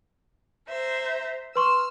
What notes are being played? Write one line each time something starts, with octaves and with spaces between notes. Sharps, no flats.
C5 E5 A#5
B4 C6 C#6 E6 F6